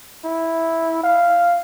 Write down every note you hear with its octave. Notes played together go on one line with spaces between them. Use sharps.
E4
F5